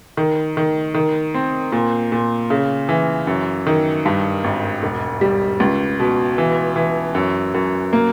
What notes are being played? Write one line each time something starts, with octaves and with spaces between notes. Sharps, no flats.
D#3
D#3
D#3
C4
A#2
A#2
C#3
E3
F#2
D#3
G2
G#1
E1
G3
C#2
B2
E3
E3
F#2
F#2
A#3